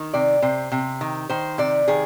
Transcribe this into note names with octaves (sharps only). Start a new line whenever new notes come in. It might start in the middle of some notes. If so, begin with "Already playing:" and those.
Already playing: D#3
C3 D5
C3 C5
C3
D#3
D#3 C5
C3 D5
D#3 G#4